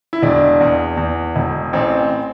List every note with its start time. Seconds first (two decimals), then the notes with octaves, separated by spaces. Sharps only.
0.13 E4
0.23 E1 D4
0.61 E2
0.97 E2
1.36 E1
1.73 A1 C4